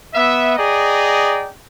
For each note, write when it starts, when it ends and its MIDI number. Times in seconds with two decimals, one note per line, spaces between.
0.14 0.56 59
0.14 0.56 76
0.57 1.50 68
0.57 1.50 74
0.57 1.50 75
0.57 1.50 79
0.57 1.50 82